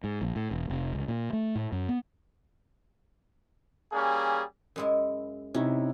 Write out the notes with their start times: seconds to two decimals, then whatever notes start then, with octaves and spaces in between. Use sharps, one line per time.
0.04 G#2
0.21 A#1
0.36 A2
0.51 E1
0.70 F1
0.93 C#2
1.08 A#2
1.33 A3
1.55 A2
1.72 F#2
1.89 B3
3.92 G3 A#3 C#4 G#4
4.76 F#2 G#3 E4
5.54 C3 C#4 D#4 E4